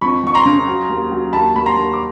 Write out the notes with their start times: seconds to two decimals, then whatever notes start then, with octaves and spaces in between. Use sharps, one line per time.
0.01 F2 B5 C#6
0.23 F2 C#6
0.34 A#5 C6
0.45 C#3
0.68 F#3
0.89 D#2
1.12 F#3
1.33 D#2 A5 B5
1.55 D#2 B5
1.66 A#5 C6
1.77 D#2
1.93 D6